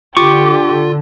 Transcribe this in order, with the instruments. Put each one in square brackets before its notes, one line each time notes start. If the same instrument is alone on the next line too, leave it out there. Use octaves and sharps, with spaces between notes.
[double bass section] D3 [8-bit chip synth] F4 [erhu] G4 [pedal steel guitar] C#6 D6